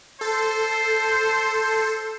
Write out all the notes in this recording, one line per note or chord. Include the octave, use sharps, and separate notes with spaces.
A4 C5